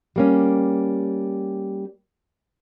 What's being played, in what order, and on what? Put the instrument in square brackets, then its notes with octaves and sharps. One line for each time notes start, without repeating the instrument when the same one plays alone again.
[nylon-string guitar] G3 A#3 C#4